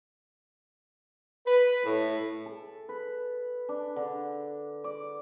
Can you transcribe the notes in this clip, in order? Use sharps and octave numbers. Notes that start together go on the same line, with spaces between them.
B4
A2
A4
B4
D4
D3
D5